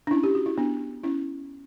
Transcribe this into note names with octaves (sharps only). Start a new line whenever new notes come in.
D4
C#4 E4
G4
F#4
E4
B3 D4
C#4 E4